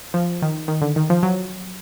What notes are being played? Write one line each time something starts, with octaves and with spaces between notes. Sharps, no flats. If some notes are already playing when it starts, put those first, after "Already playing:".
F3
D#3
D#3
D3
D#3
F3
F#3